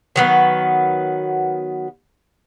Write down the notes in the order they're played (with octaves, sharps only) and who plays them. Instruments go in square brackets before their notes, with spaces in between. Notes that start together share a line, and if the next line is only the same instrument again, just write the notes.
[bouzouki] D#3 F#3 B3